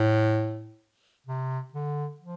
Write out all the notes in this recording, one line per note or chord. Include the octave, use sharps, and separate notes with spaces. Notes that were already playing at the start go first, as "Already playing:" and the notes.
Already playing: A2
C3
D3
F3